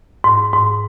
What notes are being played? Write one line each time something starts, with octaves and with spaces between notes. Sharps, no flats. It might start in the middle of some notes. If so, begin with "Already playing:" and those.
G#2
G#2